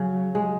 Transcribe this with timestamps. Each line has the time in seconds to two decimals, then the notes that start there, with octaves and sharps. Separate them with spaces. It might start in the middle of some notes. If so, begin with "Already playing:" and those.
Already playing: C#3 F#3
0.35 G#3